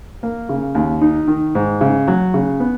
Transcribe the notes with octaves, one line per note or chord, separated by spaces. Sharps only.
A#3
C#3
D#2
D#4
D#3
G#2
C#3
F#3
C#3
B3